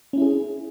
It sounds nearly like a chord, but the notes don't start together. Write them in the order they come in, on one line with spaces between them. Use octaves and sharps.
C#4 E4 G#4